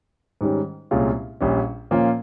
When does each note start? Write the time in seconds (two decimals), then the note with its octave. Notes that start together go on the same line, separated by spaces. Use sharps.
0.41 G#2 D#3 G3 C#4
0.91 C2 A#2 G#3 C#4 F4
1.41 A#1 A#2 G3 C#4
1.91 A#2 F3 A#3 C#4 F4